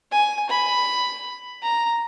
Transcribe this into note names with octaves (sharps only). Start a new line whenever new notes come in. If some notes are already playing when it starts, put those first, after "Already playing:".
G#5
B5
A#5